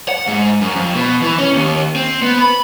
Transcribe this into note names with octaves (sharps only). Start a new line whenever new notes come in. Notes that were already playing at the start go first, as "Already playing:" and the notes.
F#5
G#2
F#2
F2
B2
E3
C#4
D#2
C4
B3
B5